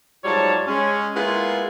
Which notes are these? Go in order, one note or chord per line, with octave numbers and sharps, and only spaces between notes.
G#2 F#3 G3 F4 C#5 A5
G#3 C#4
G#3 A#3 B3 E4 F4